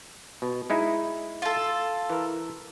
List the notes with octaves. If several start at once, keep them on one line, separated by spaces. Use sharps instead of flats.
B2
G#3 D#4 E4
F4 A4
E3 A#4